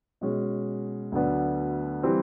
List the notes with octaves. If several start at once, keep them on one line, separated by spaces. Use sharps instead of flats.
B2 G#3 C#4
D2 D3 F#3 B3 D4
E3 G3 C4